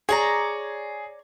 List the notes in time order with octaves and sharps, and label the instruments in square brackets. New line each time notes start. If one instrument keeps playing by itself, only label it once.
[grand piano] G#4 [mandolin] C#5 D5 A#5